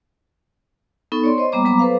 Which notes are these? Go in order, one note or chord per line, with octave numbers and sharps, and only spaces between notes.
B3 D#4 A4 C#6
C#5 D5 C6
C5 D#5
G3 A#3 B3 A#5 D6
F#3 B3 A#5 D6
A4 B4 C5 F5